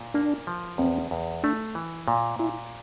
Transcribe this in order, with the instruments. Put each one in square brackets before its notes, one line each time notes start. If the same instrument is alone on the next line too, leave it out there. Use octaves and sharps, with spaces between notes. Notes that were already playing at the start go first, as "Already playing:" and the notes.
Already playing: [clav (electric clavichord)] A#2
[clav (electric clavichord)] A#3 [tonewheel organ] D4
[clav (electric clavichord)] F3
[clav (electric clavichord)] E2 [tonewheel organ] C4
[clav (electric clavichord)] E2
[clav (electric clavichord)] A3 [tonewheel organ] D4
[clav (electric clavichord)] E3
A#2
[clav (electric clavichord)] A#2 [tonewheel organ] E4